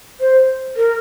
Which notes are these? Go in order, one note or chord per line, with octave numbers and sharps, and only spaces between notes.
C5
A#4